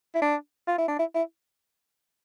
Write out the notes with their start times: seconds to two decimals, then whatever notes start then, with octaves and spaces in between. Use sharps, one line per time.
0.15 E4
0.22 D4
0.68 F4
0.78 E4
0.88 D4
0.99 E4
1.15 E4